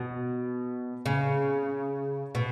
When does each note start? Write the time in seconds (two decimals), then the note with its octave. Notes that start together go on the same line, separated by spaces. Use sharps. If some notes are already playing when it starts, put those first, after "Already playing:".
Already playing: B2
1.06 C#3
2.35 B2